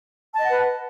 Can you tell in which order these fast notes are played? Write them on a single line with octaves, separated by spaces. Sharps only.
A5 D#5 F#5 B4